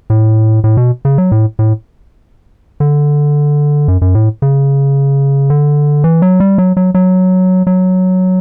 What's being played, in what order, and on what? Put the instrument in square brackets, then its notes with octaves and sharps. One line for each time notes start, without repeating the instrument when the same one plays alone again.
[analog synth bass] A2
A2
B2
C#3
F#3
A2
A2
D3
F#2
F#2
A2
C#3
D3
E3
F#3
G3
F#3
F#3
F#3
F#3